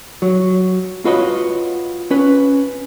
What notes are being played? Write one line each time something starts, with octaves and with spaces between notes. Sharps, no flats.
F#3
F4 F#4 B4 C#5 D#5
C#4 B4